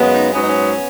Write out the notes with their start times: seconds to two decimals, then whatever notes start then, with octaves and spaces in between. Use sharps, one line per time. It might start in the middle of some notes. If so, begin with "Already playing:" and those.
Already playing: F#2 C#3 G#3 B3
0.13 D#4
0.33 G#2 F#3 B3 C#4
0.41 D#4
0.49 C#4
0.74 B3